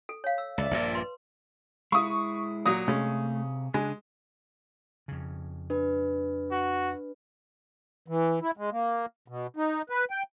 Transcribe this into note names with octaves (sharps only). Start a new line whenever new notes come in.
A4
C#5 F5
E6
C#2 D5 E5
A#1 G2 A#2
B4 C6
G#3 E4 C#6 D#6
A#2 F#3 D#6
C3 G#3 A3 C#4 F5
C#3 G#3 D4 G#5
F2 C#3
D4 B4
F#4
E3
E4
G#3
A#3
B2
D#4
B4
G5